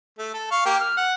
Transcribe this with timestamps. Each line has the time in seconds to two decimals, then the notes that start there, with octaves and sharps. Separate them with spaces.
0.18 A3
0.34 A4
0.51 F5 C#6
0.65 A#3 G4
0.80 F6
0.97 F#5